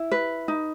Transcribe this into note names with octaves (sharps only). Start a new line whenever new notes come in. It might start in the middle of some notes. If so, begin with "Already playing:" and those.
Already playing: E4
B4
D#4